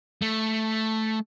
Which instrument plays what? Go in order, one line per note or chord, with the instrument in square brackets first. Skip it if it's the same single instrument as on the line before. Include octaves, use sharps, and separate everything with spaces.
[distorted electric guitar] A3